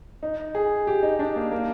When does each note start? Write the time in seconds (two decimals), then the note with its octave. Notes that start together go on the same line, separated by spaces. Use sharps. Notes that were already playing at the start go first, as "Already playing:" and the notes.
0.23 D#4
0.55 G#4
0.87 G4
1.03 D#4
1.19 D4
1.36 A#3
1.52 A#3